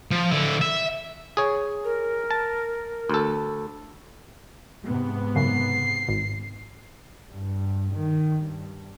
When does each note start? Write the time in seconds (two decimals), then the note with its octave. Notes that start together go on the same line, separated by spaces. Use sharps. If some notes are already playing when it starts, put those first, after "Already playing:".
0.11 F3
0.30 D3 E4
0.61 E5
1.37 G#4 C#5
1.84 A#4
2.31 A5
3.09 D2 A4
4.84 G#2 C3 B3
5.36 F#2 C#3 C7
6.08 G#1
7.31 G2
7.94 D#3
8.44 G2